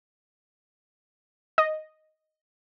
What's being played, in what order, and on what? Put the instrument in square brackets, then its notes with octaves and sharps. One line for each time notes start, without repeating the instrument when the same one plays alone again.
[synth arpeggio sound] D#5